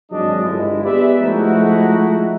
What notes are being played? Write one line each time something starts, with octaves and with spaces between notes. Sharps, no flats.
G#1 F#3 G#3 D4 D#5
G1 G#3 E4
B3 G4 G#4 B4 D5 E5
F3 G#3 A3 D#4 E4 F#4